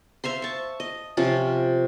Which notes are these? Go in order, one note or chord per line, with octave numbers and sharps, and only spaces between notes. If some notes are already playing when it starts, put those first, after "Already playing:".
C5 E5 F5 C6
A5 C#6
D#5
C3 F3 C#4 F4